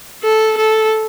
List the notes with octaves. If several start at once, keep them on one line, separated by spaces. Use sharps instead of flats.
A4
A4